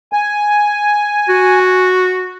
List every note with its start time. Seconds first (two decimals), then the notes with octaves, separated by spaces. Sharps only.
0.13 G#5
1.29 F#4